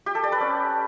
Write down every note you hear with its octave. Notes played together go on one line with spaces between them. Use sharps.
G4
A4
D5
B4
C#4